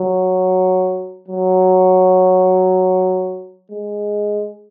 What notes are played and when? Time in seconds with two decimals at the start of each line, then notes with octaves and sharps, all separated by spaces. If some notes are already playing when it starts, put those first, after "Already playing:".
Already playing: F#3
1.28 F#3
3.71 G#3